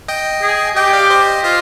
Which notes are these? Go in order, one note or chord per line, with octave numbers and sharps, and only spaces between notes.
D#5 G5
G#4
G4 D#5 G5
D5 F5
C5 D#5
F4 C5 D#5